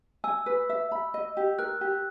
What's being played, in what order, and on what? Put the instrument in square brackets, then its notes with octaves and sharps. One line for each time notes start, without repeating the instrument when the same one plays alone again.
[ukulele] G#5 [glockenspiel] E6
[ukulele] B4
E5
B5
D#5
G4
[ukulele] A#4 [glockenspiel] F#6
[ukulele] G4